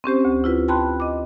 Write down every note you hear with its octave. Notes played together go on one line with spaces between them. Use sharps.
C4 C#4 G4 C5
D2
E4 F4 B4
G5 A5 B5 C6 F#6
D#5 D6